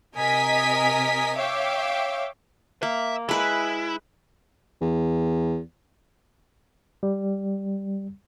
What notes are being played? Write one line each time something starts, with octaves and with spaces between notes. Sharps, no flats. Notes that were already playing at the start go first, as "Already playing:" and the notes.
C3 A#4 D#5 G#5 D#6 B6
C#5 E5 F5 G5 D6
A#3 E5
G#3 E4 B4
E2
G3